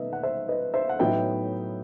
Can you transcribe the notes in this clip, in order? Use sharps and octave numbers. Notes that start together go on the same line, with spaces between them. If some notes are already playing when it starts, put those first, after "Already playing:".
Already playing: B2 A3 D#4 B4 D#5 E5
F#5
C5 E5
B4 D#5
C5 E5
F#5
A2 F#3 B3 D#4 E5 G5